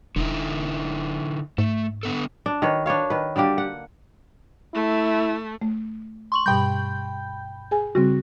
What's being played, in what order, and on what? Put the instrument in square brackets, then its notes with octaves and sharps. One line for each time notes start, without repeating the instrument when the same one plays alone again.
[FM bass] E1 [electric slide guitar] D3 D#4 E4
[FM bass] G#2 [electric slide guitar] A3
[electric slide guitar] D3 B3 A4
[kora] D4
D#3 B4 C#5
D4 B4 C#5 F5
D#3 B4
D3 G3 A#3 G4
F#5
[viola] A3 [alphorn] E4
[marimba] A3
[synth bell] C6 C#6 F#7
[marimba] G2 B2 G3 [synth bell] G5 B5 G6
[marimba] G#4 G#5
[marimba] C#3 G3 C4 [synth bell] F#4